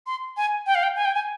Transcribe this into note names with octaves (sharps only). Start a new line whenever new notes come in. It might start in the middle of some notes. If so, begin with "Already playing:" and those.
C6
G#5
G5
F5
G5
G#5
G5
G#5